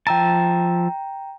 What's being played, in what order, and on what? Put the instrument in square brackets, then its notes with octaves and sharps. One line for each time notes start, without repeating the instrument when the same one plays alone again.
[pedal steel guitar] F3 E5 A5 [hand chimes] G5 A#5